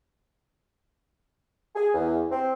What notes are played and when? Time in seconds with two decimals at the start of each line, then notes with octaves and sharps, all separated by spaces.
1.76 G#4
1.94 E2
2.31 C4